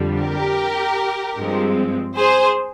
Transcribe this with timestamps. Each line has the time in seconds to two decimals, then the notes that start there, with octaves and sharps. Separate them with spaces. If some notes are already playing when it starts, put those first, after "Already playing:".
Already playing: F2 D3 G3
0.20 G4 A#4
1.38 G2 F3 G#3 C4
2.17 G#4 C5